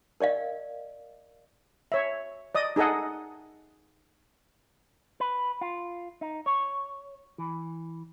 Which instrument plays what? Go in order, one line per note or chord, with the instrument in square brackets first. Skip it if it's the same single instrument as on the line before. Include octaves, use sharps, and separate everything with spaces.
[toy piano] A#4 D5 D#5 F5
[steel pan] C#5 E5
D5 D#5 D#6
D#4 G#4 A4 D#5 F#5
[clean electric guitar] B4
F4
D#4
C#5
E3